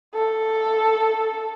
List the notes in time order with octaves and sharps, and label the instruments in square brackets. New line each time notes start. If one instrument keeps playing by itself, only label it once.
[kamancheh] A4